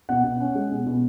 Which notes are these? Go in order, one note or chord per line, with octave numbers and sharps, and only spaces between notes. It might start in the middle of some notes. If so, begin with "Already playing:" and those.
B2 F#5
B2
C#4
G#3
B2
B2